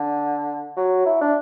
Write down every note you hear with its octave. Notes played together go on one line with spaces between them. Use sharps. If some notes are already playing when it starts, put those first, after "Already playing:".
Already playing: D3
F#3
E4
D4